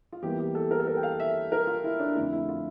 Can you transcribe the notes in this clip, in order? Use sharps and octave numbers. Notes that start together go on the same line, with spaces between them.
F4
E2 E3 G3 A#3 G4
G4
A4
A#4
A4
A#4
G5
F5
E5
A#4
F4
E4
D4
F2 D3 A3 E4
E4
F4